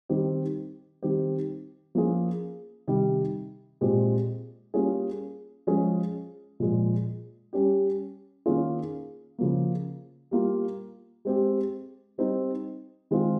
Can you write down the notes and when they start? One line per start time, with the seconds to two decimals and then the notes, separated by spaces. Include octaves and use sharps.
0.09 D#3 G3 C4 G4
1.03 D#3 G3 C4 G4
1.95 F3 A#3 C#4 F4 G#4
2.88 C3 D#3 G3
3.81 A#2 G#3 C4 G4
4.74 G3 A#3 C#4 F4 G#4
5.67 F3 G#3 C#4 G#4
6.60 A#2 F3 G#3
7.53 G3 C#4 G4
8.46 D#3 A#3 C#4 F4 G#4
9.38 C#3 F3 A#3
10.31 G3 A#3 F4
11.25 G#3 C4 G4
12.18 G3 C4 D#4
13.11 D#3 G#3 C4 F4